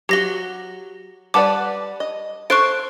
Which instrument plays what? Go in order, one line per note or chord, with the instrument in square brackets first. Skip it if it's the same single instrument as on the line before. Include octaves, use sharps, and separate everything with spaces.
[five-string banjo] F#3 F#4 [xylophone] G4 A#6 G7
[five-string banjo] G3 B4 D5 [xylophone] F#5 A5 D6
[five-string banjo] D#5
[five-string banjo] A4 C5 [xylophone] C#6 F#6 D7